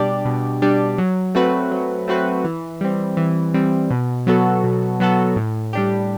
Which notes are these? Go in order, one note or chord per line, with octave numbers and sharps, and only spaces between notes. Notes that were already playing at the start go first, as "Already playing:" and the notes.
Already playing: B2 G3 D4 G4 D5
B2
G3 D4 G4 D5
F#3
A3 C4 F#4 B4
F#3
A3 C4 F#4 B4
E3
G3 C4
E3
G3 C4
B2
F#3 B3 F#4 A4
B2
F#3 B3 F#4 A4
A2
G3 D4 G4